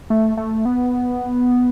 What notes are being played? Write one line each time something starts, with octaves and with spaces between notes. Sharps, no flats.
A3
A3
B3